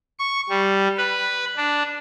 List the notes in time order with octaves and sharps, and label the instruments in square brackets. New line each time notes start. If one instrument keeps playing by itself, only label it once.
[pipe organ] C#6
G3
B4
D4